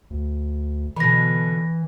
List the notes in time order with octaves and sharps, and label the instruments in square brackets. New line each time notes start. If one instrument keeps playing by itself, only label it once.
[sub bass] D2
[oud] B2 D3 [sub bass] E3 [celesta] B5 A#6